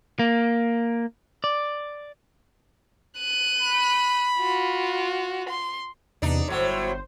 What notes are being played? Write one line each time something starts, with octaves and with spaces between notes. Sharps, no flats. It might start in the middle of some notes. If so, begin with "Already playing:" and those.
A#3
D5
F#6 D#7
B5
F4 F#4
C6
E2 C3 B3 D4 D#4
G1 A2 F#3 C5